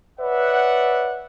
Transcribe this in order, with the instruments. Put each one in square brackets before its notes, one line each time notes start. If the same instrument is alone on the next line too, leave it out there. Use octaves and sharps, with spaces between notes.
[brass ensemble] B4 C#5 D5 E5 F#5